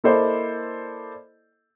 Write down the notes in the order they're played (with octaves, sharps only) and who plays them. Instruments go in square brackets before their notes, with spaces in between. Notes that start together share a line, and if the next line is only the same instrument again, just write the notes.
[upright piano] A#3 E4 A4 C5 D5 D#5